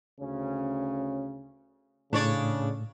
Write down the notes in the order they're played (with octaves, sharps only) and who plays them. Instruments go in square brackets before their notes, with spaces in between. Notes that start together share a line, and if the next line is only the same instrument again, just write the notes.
[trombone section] D2 C#3 C#4
[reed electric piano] A2 [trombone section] C#3 [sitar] D4 C#5 D5